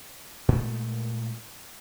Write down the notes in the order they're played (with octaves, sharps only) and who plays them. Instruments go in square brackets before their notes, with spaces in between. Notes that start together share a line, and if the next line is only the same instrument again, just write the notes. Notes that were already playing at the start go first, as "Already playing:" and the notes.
[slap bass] A#2 G#3 A3